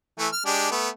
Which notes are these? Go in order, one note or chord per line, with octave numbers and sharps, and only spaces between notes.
E3 A3
F6
G#3 D4 G4
A3 B3